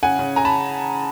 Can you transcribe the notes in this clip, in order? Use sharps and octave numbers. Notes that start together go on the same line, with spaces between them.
C#3 F#5 G#5
C#3
G#5 A#5
A5 B5